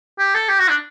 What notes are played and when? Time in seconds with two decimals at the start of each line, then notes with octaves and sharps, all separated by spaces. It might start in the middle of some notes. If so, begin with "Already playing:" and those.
0.19 G4
0.35 A4
0.49 G4
0.59 F#4
0.69 D4